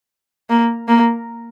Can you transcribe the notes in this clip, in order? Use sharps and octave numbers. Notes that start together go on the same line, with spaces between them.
A#3
A#3